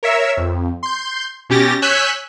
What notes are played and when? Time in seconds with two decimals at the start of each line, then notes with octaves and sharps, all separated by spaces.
0.03 A#4 C#5 E5 E6
0.37 F2
0.83 C6 G6
1.49 B2 C#4 G4 A6 A#6
1.82 C#5 G#5 E6 F#6 G6 B6